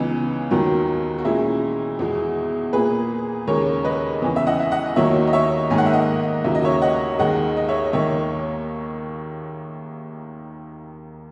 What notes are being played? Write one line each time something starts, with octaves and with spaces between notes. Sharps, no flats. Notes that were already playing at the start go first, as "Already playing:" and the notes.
Already playing: C#2 C#3 E3 B3 D#4
D#2 D#3 F#3
F#4
A#2 G#3 C#4 E4
E2 B2 G#3
A#2 A#3 G#4 B4
D#2 C#3 G#3 A#4 C#5
B4 D#5
E2 C#3 E3
E5
D#5 F#5
E5
D#5 F#5
D#5
D#2 D#3 F#3 A#3 C#5 E5
D#5
C#5 E5
G#2 D#3 A#3 G#5
F#5
E5
D#5 F#5
D#2 C#3 F#3 A#3 E5
D#5
C#5 E5
D#5 F#5
D#2 D#3 G#3 D#5 F#5
D#5
C#5 E5
D#5
D#2 D#3 A#3 C#5 E5